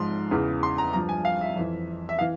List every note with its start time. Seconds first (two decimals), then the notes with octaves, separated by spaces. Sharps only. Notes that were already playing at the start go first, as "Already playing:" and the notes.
Already playing: G#2 F3 C6
0.31 E2 C#3 E3
0.63 C6
0.78 A#5
0.93 G2 F3 A#5
1.09 G#5
1.25 F5
1.41 E5
1.56 F2 E3
2.09 E5
2.19 E3 F5